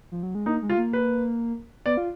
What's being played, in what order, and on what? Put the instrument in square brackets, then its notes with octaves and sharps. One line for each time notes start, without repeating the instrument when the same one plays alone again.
[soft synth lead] F3
F#3
G#3
[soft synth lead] A#3 [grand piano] D#4
[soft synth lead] G#3
[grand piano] F4
[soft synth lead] A#3
[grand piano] B4
[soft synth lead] B3 [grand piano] D5
[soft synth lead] F4